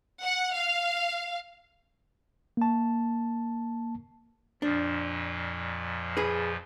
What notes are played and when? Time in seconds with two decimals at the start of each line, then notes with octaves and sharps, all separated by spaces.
0.22 F#5
0.53 F5
2.57 A#3 A5
4.62 F2 A#2 F3 D4
6.17 G#4 B4